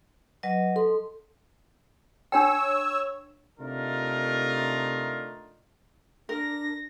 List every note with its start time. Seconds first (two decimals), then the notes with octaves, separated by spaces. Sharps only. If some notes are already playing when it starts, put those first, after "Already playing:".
0.43 F#3 B4 D#5
0.76 A4 C6
2.32 D4 C#5 G5 E6
3.60 C3 A3 D4 D#4 F4 A#4
6.29 D4 A#4 A#6